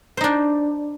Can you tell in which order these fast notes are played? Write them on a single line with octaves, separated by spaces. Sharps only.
C5 D#4 D4